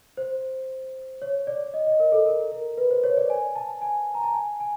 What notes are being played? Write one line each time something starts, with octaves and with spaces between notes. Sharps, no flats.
C5
C#5
D5
D#5
D#5
A#4
A4
A#4
A#4
B4
C5
C#5
D5
G#5
A5
G#5
A#5
A5
G#5
G#5